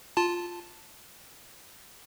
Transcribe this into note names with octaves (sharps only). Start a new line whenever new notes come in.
F4 A5